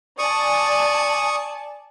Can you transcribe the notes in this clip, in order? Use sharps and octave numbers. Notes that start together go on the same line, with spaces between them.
D5 G#5 A5 C#6 D#6